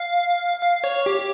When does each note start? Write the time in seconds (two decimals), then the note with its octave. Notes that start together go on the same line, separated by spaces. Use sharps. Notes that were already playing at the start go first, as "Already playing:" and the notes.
Already playing: F5
0.61 F5
0.84 C#5
1.06 G4